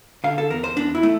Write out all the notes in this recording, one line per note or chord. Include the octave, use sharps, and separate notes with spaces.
D3 F5
A4
E2 A#4
C5
E2 D4
E4
A3